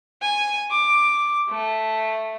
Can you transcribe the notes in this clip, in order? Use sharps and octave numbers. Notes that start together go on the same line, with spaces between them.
G#5
D6
A3